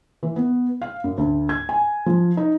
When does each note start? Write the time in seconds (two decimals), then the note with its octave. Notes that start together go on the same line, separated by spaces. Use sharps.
0.23 E3
0.36 B3
0.82 F5
1.04 F#2
1.18 D2
1.49 G#6
1.69 G#5
2.06 F3
2.37 D#4